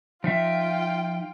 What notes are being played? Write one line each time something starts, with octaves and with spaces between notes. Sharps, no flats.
F3 D#4 F4 E5 G5